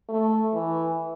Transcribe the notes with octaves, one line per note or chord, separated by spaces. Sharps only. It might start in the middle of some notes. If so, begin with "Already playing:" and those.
A3
E3